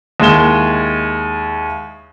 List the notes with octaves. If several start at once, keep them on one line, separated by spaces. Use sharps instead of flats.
D#2 G#3 E4 E7 G7